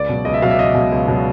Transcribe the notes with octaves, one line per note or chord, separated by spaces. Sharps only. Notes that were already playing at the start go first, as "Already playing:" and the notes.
Already playing: C#2 D5
B2 F#3
C#2 D#5
E5
B2 F#3 F5
E5
C#2 D#5
B2 F#3
C#2
B2 F#3